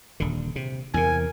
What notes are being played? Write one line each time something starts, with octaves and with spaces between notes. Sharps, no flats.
D#1 D3
C3
E2 C3 A#4 G#5